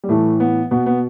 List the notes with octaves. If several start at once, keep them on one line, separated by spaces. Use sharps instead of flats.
G3
A2 E3 A3
B3
B2 B3
B3